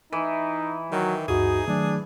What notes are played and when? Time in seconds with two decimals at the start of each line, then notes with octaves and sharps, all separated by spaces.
0.13 E3 D#4
0.92 D#3 F#3
1.28 D2 G2 D#4 F#4 G#4
1.68 D#3 F#3 A3 D4